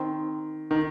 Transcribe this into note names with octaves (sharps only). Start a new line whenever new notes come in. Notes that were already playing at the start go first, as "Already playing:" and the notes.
Already playing: D#3 C4
D#3